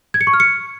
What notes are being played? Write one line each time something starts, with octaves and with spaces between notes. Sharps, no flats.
G#6
C#7
C#6
F6
C#7